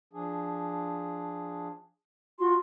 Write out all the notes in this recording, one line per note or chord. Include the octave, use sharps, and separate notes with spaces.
F3 D4 G#4
F4 F#4 C6